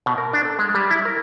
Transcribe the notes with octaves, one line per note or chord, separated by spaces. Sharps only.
B2
A#4
D4
A4
G#3
G3
E4
A#4